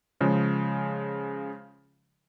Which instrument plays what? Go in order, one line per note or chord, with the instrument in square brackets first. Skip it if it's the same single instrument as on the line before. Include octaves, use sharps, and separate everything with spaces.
[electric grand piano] C#3 F3 G#3